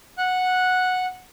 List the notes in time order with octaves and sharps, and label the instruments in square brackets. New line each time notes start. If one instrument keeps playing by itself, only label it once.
[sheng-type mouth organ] F#5 F#6